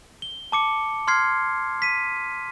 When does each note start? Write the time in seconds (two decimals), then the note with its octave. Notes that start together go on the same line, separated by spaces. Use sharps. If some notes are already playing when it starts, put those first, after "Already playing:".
0.22 G7
0.52 A5 D6 C#7
1.07 C6 F6 G#6 C7
1.82 B6 D#7